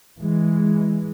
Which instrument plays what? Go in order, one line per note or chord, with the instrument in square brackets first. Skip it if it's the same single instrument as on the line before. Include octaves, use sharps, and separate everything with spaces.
[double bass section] E3 G#3